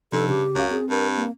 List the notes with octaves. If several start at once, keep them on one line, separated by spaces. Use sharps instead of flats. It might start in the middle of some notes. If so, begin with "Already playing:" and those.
G2 C3 F3 D#4 A4
C#3 G4
C#2 F#2 C#4 F5
C4 G#4
G2 A#4
A#3